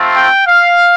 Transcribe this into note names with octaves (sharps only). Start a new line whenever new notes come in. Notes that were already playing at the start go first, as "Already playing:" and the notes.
Already playing: A3 C4 F4
G5
F5